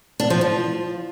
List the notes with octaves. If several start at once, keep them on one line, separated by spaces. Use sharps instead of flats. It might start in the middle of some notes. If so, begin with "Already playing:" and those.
D4
F3
F3